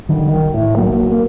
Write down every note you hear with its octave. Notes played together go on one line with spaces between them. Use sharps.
D3 D#3 G3
B1 D#3
A2
B1 F#3 A#3
A#3